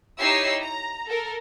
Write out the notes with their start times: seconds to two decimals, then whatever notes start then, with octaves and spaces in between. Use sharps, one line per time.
0.19 D#4 E4 G4 C#5 E6 C7
0.62 A#5
1.07 A4 A#4